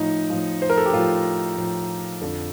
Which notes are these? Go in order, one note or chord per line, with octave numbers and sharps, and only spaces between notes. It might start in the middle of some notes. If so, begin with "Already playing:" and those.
Already playing: A2 F3 D#4
A2 F3
C5
A#4
A4
G4
A2 F3 F4
A2 F3
F2 D3 F3 A4